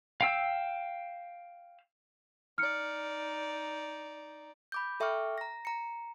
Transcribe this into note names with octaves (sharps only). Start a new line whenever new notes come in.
F5 G5 E6
D#4 D5 F6 C#7
B5 D6 G6
A4 E5 G5 C#6 D6 F6
A#5 A#6
A#5 C#7